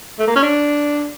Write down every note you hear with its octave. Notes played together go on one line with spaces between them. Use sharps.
A3
A#3
C#4
D4